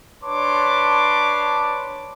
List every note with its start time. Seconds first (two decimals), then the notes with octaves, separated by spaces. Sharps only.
0.24 D4 B4 C#5 A5 C6 D6